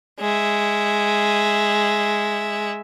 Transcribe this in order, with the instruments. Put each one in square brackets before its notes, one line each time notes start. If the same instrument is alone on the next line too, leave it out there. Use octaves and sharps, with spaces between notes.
[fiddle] G#3 E5